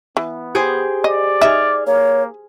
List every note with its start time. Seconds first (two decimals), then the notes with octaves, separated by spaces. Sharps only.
0.17 E3 B3
0.55 G4 G#4 C5
1.04 D5 D#5
1.41 D#4 G#4 E5 F6
1.87 A#3 C#5